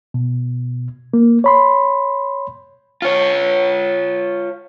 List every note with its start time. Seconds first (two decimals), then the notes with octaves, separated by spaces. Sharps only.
0.14 B2
1.14 A#3
1.44 C#5 B5 C6
3.02 F4 C#5